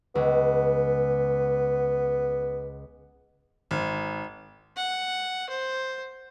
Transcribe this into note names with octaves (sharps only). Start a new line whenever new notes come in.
C#2 B3
G#1
F#5
C5